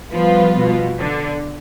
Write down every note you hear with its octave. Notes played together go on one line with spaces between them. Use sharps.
F3 G3 B3 F4 B4
B2
D3